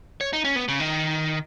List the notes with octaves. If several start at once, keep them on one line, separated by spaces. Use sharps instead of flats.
C#5
D#4
C#4
B3
C#3
D#3